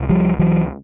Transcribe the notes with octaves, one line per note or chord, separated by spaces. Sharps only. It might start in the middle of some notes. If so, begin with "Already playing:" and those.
Already playing: C#2 C3
F3 G3
E3 F#3